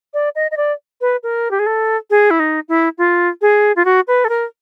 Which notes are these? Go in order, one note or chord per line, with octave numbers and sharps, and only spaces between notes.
D5
D#5
D#5
D5
B4
A#4
G4
G#4
A4
G#4
E4
D#4
E4
F4
G#4
F4
F#4
B4
A4
A#4